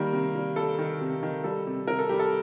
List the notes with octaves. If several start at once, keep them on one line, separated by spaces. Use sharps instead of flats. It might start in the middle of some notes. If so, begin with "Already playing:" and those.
Already playing: D#3 G3 A#3 A#4
C3
G3
G3 A4
D#3
C3
D#3
G3 A4
C3
C3 A#4
A4
G3 G4
A4